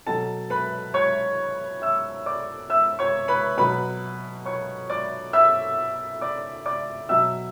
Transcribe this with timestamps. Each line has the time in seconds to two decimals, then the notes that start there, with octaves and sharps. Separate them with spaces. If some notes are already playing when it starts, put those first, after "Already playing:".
0.07 B2 F#3 A4 A5
0.50 B4 B5
0.94 C#5 C#6
1.82 E5 E6
2.26 D5 D6
2.70 E5 E6
2.99 C#5 C#6
3.28 B4 B5
3.57 B2 F#3 B4 B5
4.45 C#5 C#6
4.90 D5 D6
5.33 E5 E6
6.21 D5 D6
6.66 D5 D6
7.09 B2 F#3 E5 E6